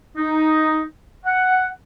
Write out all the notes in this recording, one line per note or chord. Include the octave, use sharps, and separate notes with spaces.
D#4
F#5